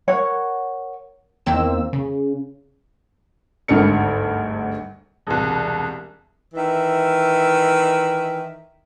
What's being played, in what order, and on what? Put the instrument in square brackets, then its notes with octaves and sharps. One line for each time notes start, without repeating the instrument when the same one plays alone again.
[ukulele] A#4 C#5 F#5
[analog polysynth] E2 D#3 A#3 C4 E6
C#3
[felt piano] G#1 D2 G2 A#4 C#7
[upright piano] E1 C2
[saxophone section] D#3 E3 E5